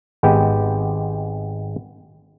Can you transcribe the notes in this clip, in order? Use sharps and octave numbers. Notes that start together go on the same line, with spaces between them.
G#1 G#3 B3 G4